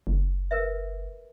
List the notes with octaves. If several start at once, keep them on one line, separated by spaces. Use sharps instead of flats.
F#1
A#4 B4 E5